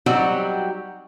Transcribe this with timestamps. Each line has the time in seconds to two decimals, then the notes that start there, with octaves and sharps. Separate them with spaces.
0.06 F#3 G3 C4 D#4 F#4 G4